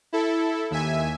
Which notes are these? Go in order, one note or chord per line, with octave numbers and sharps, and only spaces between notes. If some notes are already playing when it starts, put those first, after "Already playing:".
E4 A4
D#2 E5 G#5